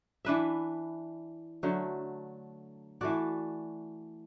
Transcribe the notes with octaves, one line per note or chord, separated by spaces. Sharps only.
E3 D4 B4 E5
D3 F#3 A3
E3 A3 F#4 D5